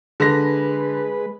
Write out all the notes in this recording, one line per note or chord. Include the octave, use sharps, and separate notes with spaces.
D3 G#3 B4 A#6